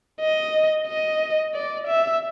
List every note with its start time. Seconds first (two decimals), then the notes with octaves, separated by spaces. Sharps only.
0.21 D#5
0.88 D#5
1.54 D5
1.88 E5